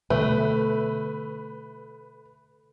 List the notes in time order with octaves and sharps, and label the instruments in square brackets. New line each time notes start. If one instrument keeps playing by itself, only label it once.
[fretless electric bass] B2 D3 G3 [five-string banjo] A3 [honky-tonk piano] B4